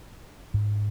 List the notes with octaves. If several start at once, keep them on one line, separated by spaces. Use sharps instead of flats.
G#2